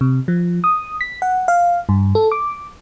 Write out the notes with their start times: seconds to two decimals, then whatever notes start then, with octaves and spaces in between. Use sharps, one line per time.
0.01 C3
0.28 F3
0.64 D#6
1.01 B6
1.22 F#5
1.48 F5
1.89 G2
2.15 A4
2.32 D6